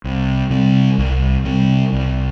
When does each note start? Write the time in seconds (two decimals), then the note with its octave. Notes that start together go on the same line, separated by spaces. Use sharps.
0.04 C2
0.50 C3 G3
0.98 C2
1.45 C3 G3
1.93 C2